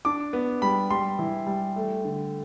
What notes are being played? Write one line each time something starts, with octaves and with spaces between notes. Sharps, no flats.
D4 D6
B3
G3 B5
G3 C6
E3
G3
A3
D3